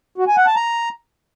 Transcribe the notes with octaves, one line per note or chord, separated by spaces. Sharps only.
F#4
G#5
F#5
A5
A#5